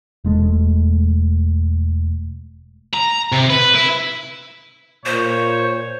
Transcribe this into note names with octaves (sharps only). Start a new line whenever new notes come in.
E1 G#3 A3
A#5
C3
B4
E4
A#2 C5 C#5